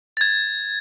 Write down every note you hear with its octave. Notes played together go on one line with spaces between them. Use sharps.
G#6 A6